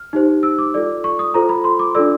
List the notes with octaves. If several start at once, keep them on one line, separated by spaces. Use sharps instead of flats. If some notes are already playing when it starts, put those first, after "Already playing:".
Already playing: F6
D#4 G4 C5
E6
D6
F4 A4 D5
C#6
D#6
F4 A4 C5 A#5
B5
C6
D6
D4 F4 A4 D5 E6